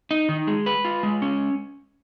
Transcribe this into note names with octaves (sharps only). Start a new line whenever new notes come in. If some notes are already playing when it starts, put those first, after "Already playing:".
D#4
D#3
G#3
B4
F4
G#3
C#4